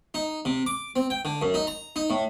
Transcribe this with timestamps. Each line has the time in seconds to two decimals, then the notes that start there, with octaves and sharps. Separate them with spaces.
0.14 D#4
0.45 C3
0.66 D6
0.96 C4
1.10 G5
1.25 D3
1.42 F#2
1.54 D#4
1.67 A#5
1.96 D#4
2.10 A2